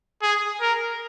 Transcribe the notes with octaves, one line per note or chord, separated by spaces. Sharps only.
G#4
A#4